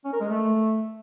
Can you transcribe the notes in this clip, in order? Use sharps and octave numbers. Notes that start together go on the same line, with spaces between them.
C#4
A#4
G#3
A3